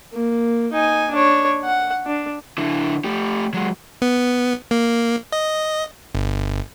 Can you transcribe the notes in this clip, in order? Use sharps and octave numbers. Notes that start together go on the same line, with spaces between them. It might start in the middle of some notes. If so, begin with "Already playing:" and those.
A#3
D#4 G#5
D4 C#5
F#5
D4
D3 E4
A3 G4
F#3 G#3
B3
A#3
D#5
G1